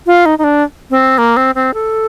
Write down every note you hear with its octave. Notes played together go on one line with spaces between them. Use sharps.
F4
D#4
D#4
D4
C4
A#3
C4
C4
A4